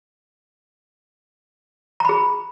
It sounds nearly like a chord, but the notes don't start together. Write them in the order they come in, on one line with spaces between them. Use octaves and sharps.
A#5 B5 G#4